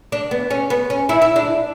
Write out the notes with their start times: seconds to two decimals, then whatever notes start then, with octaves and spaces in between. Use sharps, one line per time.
0.12 D4
0.31 B3
0.51 C#4
0.70 B3
0.90 C#4
1.09 E4
1.22 E4
1.36 D4